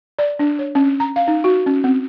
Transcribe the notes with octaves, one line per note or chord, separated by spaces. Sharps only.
D5
D4
C#5
C#4
A#5
F5
D#4
F#4
C#4
C4